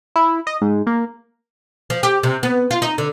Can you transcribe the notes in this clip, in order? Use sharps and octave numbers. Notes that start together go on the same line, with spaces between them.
E4
D#5
G#2
A#3
F3
G4
C3
B3
F4
D#4
D3